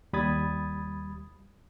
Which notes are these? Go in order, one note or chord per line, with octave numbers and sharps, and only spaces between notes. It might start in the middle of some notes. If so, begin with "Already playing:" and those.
D#2 G3 B5 D#6 G#6 A6